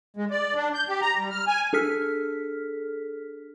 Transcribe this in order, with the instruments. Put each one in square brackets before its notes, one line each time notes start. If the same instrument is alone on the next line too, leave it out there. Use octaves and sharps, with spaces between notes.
[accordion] G#3
D5
D4
G6
G4
A#5
G3
F6
G#5
[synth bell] D4 G#4 A4 F6 B6